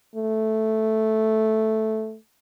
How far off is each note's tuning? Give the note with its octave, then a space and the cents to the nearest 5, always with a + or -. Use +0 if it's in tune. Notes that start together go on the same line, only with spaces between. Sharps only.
A3 -5